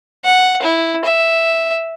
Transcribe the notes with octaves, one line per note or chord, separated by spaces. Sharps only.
F#5
E4
E5